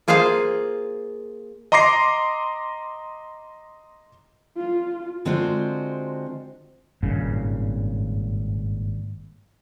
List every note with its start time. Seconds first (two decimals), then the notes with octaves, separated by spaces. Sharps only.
0.08 A#3 F4 G#4 C5 F5
1.72 D#5 A#5 C6 D6 A#6 C7
4.58 F4
5.25 D3 G#3 C4 F4 F#4 C5
7.03 G#1 G2 A#2 C#3